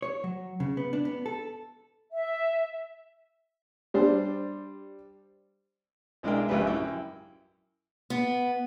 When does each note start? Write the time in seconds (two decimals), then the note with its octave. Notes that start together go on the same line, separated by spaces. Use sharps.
0.02 C#5
0.24 F#3
0.60 C#3
0.77 B3
0.93 D4
1.05 B3
1.26 A4
2.12 E5
3.94 G3 D4 C5
6.23 B1 G#3 D4 E4 A#4 G5
6.48 A#1 G#2 C#3 G4 B4 E5
6.66 F#2 E4 G5
8.10 B3